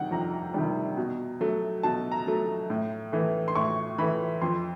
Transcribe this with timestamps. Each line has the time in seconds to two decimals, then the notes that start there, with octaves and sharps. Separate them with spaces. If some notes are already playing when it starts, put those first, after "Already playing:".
Already playing: C3 D#3 G3 F#5 G5
0.11 F2 A#5
0.54 C3 D#3 G3
0.97 B2
1.40 F#3 A3
1.83 B2 A5
2.12 A#5
2.27 F#3 A3
2.70 A2
3.12 E3 A3
3.48 C6
3.55 A2 C#6
3.98 E3 A3 B5
4.42 F2 C6